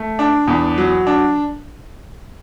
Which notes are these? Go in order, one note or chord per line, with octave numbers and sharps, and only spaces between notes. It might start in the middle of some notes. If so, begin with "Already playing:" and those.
Already playing: A3
D4
E2
F#3
D4